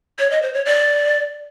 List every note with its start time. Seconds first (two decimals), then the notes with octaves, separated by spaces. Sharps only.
0.19 C#5
0.31 D#5
0.42 C5
0.54 C#5
0.66 D5